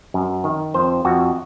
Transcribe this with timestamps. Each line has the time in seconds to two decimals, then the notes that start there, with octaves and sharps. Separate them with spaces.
0.14 F#2
0.44 D#3
0.74 F2 C5
1.05 F2 F#4